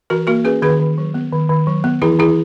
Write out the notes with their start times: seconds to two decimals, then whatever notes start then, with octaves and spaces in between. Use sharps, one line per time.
0.10 E3 F#4 A#4
0.27 A#3 F#4 A#4
0.44 C#4 G#4 B4
0.62 D#3 G#4 B4
0.80 D#3
0.98 F#3
1.14 B3
1.33 D#3
1.49 D#3
1.67 F#3
1.84 B3
2.02 E3 E4 G#4
2.19 E3 E4 G#4